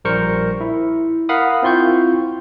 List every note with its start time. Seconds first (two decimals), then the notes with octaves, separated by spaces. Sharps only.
0.05 A#1 G3 A#4 C5 C#6 C#7
0.61 E4
1.29 A#4 F5 F#5 B5 D#6
1.62 C4 E4 F4 C6 C#6 G6